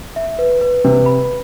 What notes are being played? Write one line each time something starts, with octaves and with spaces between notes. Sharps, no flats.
E5
B4
B4
C3 B4
B5